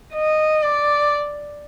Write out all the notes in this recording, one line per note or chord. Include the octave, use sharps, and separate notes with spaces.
D#5
D5